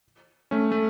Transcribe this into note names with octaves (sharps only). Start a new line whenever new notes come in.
A3 C#4
A3